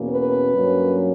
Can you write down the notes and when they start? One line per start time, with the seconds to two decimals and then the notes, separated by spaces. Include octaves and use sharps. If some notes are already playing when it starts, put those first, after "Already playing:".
Already playing: E2 B2 A#3 C#4
0.10 B4
0.52 G2 F#3 A#3 C#4